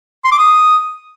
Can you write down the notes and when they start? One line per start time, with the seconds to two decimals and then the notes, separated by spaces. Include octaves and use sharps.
0.25 C6
0.32 D6
0.38 D#6